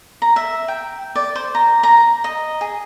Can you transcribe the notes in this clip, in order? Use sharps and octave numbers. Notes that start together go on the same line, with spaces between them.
A#5
E5
G5
D5
C5
A#5
A#5
D#5
G#4